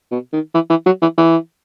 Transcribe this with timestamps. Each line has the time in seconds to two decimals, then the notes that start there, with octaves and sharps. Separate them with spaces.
0.11 B2
0.33 D#3
0.54 E3
0.70 E3
0.86 F#3
1.02 E3
1.18 E3